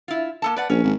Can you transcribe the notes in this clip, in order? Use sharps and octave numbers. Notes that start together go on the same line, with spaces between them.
E4 F4
A#3 A4 A5
B4 D5 F#5
A#1 C#4
G#1